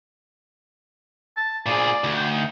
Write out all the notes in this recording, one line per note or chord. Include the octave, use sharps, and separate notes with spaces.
A5
A#2 G#4 D5
D2
G5
D#4